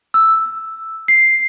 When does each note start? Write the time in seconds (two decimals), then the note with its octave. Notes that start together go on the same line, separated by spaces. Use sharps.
0.14 E6
1.08 C7